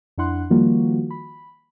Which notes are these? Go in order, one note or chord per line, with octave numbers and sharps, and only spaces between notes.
F2 D4 E4 F#5 C6 F#6
D#3 F3 G3 A#3 F4 F#4
B5